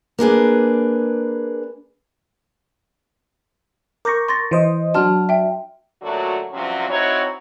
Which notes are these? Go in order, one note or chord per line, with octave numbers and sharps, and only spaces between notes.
A#3 D4 G#4 B4
A#4 C#6 D6 G6 A#6
C6 A6 A#6
E3 C5 D#5
F#3 D4 F#4 A5 C6 F6
E5 G5
A#2 D3 F#3 A3 F#4
G2 C3 F3 F#3 C#4 F#4
C4 D#4 E4 F#4 C#5